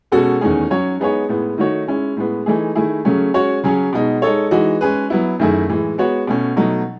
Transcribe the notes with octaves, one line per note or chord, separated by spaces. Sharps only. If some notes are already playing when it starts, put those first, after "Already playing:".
B2 G#3 C#4 F#4 A4
E2 D#3 A3 C#4 G#4
F#3 C#4 F#4 C#5
G#3 B3 D#4 G#4 C#5
A2 G#3 B3
D#3 A3 D#4 F#4 C#5
G#3 C#4 E4
A2 G#3 B3
E3 A3 D#4 G#4
D#3 A3 E4 G#4
C#3 F#3 A3 C#4
G#3 C#4 F#4 C#5
C#3 F#3 C#4 G#4
B2 G#3 D#4
G#3 D#4 A4 C#5
E3 G#3 D#4 F#4
G#3 C#4 G#4 B4
F#3 B3 E4
F#2 D#3 A3 E4 G#4
A2 E3 G#3
G#3 B3 F#4 C#5
B2 A3 C#4
B2 F#3 A3 D#4